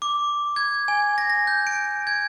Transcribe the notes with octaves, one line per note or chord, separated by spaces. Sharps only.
D6
G#6
G#5
A#6
A#6
G6
D7
G#6